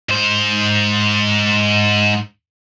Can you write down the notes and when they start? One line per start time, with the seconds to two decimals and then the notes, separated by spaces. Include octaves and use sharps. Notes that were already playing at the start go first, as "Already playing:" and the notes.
0.09 G#2 C5